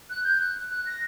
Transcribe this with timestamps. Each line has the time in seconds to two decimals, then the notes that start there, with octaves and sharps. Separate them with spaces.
0.10 F#6
0.24 G6
0.41 F#6
0.71 F#6
0.86 A#6